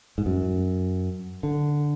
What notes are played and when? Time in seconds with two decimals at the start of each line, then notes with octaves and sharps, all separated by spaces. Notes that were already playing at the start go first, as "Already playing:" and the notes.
0.18 G#2
0.26 F#2
1.43 D3